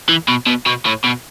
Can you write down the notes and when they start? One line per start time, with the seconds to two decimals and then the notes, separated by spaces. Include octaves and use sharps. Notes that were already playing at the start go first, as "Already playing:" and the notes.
0.09 E3
0.28 B2
0.46 B2
0.66 B2
0.85 A2
1.04 B2